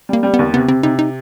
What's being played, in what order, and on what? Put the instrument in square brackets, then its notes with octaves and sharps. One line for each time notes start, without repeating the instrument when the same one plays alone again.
[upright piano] G3 [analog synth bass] A#3
[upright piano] G3
[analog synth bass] B3
[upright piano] D#2
[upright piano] C3 [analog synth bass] B3
[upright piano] C3 [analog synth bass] C4
[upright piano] C3 [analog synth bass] D#4
[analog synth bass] D#4